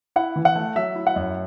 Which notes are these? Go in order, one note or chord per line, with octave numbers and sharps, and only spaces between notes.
E4 F#5
E3
F#5
A3
F#3 E5
E4
F#5
F#2